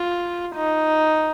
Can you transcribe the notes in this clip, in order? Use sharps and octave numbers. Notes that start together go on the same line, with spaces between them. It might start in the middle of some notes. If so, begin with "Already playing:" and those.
Already playing: F4
D#4